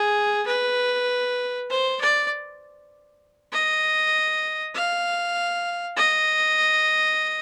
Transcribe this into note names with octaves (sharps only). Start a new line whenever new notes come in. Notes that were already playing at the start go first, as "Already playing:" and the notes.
Already playing: G#4
B4
C5
D5
D#5
F5
D#5